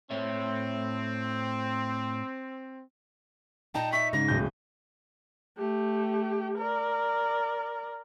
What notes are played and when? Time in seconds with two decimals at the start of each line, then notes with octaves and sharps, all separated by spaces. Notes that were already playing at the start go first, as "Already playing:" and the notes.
0.11 A2 C4 C#5 E5
3.75 A#2 D#4 G5 A5 A#5
3.93 E5 C#6 B6
4.13 G#2 C#3 G#3 A#6
4.28 D1 G6
5.58 A3 G4
6.58 A#4 D5